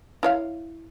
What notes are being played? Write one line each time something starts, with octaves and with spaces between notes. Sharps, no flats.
E4 C#5 F5